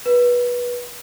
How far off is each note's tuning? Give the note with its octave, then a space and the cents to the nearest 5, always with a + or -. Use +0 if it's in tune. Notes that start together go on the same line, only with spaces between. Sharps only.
B4 -25